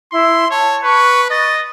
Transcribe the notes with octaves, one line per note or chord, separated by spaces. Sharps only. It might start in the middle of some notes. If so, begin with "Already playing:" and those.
E4 C6
C#5 A5
B4 C#6
D#5 A6